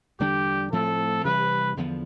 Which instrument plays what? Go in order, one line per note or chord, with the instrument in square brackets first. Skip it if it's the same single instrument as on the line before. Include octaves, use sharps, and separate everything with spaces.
[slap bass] E2 D3 G3 D4 [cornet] G4
[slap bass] A2 F3 A3 C4 [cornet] A4
[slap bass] C3 E3 G3 [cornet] B4
[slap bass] E2 D3 F3 B3